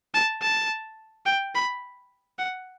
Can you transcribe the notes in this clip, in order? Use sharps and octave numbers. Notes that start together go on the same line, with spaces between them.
A5
A5
G5
B5
F#5